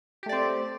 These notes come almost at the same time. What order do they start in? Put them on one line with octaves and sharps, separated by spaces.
G4 A3 D5 C4